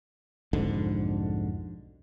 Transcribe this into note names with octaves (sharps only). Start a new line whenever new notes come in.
B1 F2 G#2 D3